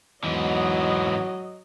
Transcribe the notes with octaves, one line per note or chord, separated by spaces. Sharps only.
E2 G#2 E3 F#3 D#5